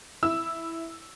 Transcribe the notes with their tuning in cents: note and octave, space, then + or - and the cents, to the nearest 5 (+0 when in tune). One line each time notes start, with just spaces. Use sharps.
E4 +0 E6 +0